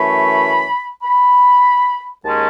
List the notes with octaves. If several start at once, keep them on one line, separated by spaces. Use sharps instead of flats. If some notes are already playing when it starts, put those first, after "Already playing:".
Already playing: F#2 E3 A3 C#4 B5
B5
D#2 D#3 G#3 C#4 A5